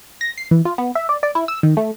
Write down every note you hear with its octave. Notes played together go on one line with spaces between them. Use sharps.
A#6
C7
E3
F4
B3
E5
D5
D5
E4
E6
D#3
A3